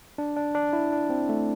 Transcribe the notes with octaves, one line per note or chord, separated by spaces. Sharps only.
D4
D4
D4
E4
D4
C4
A3